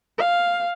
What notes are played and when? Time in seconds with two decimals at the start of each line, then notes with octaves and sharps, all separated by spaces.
0.18 F5